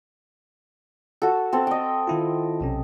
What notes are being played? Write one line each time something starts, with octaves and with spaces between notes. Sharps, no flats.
F#4 A4 F#5
C4 A4 A5
D#5 G5
D#3 E4 F4
B1 C3 C#4